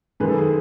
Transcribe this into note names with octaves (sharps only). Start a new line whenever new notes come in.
F#2 D#3 G#3 B4
A4
G#4